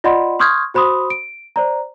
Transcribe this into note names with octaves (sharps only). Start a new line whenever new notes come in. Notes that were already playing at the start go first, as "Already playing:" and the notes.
F4 D5 D#5 F#5 B5 C6
C6 C#6 D#6 F6 G6 G#6
F#4 C5 B5 C6 D#6
D7
C5 D5 A#5